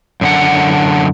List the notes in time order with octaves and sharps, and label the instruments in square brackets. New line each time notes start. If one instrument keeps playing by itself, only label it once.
[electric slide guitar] F#2 D3 F#5